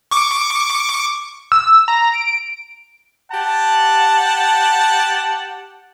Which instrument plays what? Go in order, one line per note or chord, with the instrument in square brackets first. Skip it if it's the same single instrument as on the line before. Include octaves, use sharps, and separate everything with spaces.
[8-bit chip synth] C#6 D6
[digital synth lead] E6
A#5
D7
[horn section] G4 F#5 A5